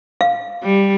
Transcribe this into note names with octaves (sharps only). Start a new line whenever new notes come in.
F5
G3